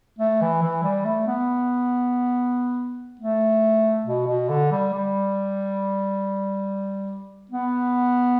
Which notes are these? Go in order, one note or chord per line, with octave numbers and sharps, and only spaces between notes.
A3
E3
E3
G3
A3
B3
A3
B2
B2
D3
G3
G3
B3